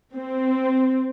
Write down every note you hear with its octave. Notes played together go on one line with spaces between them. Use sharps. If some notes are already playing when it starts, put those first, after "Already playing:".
C4